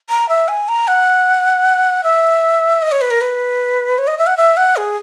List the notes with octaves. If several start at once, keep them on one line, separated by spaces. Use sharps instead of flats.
A#5
E5
G#5
A#5
F#5
E5
D#5
C#5
B4
A#4
B4
C#5
D#5
E5
F#5
E5
F#5
G#4